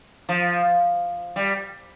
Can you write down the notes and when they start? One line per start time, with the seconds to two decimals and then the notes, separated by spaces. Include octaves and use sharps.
0.29 F3
1.36 G3